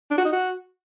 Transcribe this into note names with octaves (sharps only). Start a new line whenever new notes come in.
D4
F#4
D#4
F#4